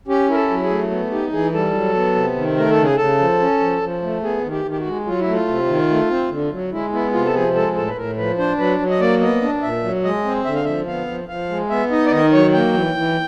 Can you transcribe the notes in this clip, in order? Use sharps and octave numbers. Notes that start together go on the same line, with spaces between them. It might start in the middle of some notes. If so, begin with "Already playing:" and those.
C#4 G4
E4 A#4
A4
F#3
G#4
A3
B3
D#4 G4
E3 G#4
G3 A4
F#3
B3
C3
D#3
A3 A#4
A4
C#3
G#4
C#3 A4
F3
C#4
F3
F3
A3
B3 G#4
D#3
G4
D#3
G4
F#4
G#3
F#3 F4
E4
A3
F4
C3
D#3
A3
C4
D3
F#3
G#3 E4
B3 E4
C3 F4
A4
F3 G#4
G#3 A4
A2 A4
B4
A2 A#4
F3 B4
D4 C5
F#3 B4
F#3
D#5
A#3 D5
B3 D#5
D4
A#2 E5
F#3
G#3 D#5
C4
D3 E5
F5
F3 E5
B3 F5
F3
F3 F5
G#3
B3 E5
D#4 D#5
D5
D#3 D#5
F#3 C#5
A#3 G5
E3
E3